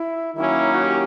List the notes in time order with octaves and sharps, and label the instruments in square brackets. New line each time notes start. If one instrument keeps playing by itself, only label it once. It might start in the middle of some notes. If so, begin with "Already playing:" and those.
Already playing: [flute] E4
[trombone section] D#3 F#3 A#3 C#4 [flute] E4
[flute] F#4
G4